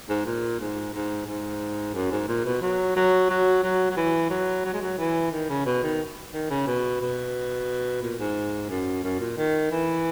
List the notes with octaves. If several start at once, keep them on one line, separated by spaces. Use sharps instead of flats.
G#2
A#2
G#2
G#2
G#2
F#2
G#2
A#2
B2
F#3
F#3
F#3
F#3
F#3
E3
F#3
F#3
G#3
F#3
E3
D#3
C#3
B2
D#3
D#3
C#3
B2
B2
A#2
G#2
F#2
F#2
A#2
D#3
E3